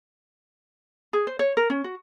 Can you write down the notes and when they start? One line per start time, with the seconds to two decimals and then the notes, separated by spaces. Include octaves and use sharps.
1.13 G#4
1.27 C5
1.39 C#5
1.57 A#4
1.70 C#4
1.84 F#4